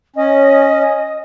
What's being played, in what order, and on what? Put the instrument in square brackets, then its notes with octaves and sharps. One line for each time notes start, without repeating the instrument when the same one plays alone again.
[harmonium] C#4 [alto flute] D#5